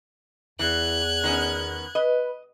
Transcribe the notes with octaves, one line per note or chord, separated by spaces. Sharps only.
E2 E3 F#6 G#6
D#3 B3 C#4
B4 D#5